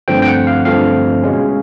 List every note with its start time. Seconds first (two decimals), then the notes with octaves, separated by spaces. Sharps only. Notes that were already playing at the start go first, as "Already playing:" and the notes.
0.08 G2 D3 F3 A3 C4 G5
0.22 G5
0.27 F#5
0.47 F5
0.65 G2 D3 F3 A3 C4 F5
1.23 B2 G#3 C#4